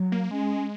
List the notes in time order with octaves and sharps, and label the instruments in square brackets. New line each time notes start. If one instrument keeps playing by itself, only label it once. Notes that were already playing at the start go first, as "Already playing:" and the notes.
Already playing: [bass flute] F#3
[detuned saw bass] A#3
[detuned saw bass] G#3 [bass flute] C#4